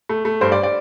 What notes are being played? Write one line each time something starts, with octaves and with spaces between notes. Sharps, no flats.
A3
A3
G2 C5
D5
D5